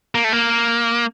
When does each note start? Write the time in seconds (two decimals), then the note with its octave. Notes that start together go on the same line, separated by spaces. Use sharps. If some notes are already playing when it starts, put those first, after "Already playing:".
0.15 A#3
0.24 A3
0.33 A#3